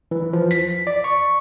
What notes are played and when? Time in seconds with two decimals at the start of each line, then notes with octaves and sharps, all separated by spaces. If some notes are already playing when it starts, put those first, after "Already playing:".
0.11 E3
0.33 F3
0.51 B6
0.87 D5
1.04 C#6